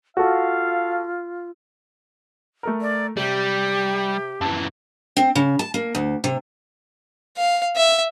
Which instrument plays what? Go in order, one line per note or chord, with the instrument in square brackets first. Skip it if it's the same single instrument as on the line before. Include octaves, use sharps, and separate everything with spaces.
[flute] F4 [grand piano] F#4 A4 [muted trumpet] F5
[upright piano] A3 A4 A#4
[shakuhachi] D5
[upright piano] C3 [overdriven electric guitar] G3 [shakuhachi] G4
[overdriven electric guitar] F#2 E3 [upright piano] A5
[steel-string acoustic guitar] C4
C#3
A5
A#3
D2
C3
[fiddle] F5
E5